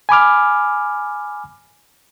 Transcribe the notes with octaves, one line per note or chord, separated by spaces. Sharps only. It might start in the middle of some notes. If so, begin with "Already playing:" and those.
G#5 B5 D6 F6